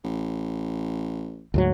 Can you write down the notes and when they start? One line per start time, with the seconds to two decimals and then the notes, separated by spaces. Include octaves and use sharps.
0.04 A1
1.54 D2 G#2 F#3